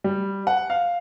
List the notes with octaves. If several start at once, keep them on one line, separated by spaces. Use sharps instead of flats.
G3
F#5
F5